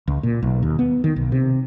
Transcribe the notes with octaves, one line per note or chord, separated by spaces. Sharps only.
C#2
A#2
B1
D#2
B3
D#3
B1
C3